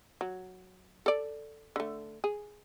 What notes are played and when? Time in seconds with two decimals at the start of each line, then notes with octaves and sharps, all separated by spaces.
0.21 F#3
1.06 A4 D5
1.76 D3 A3
2.24 G#4